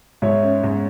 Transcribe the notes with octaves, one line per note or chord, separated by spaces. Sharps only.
G#2 C#5 E5
C#4
G#2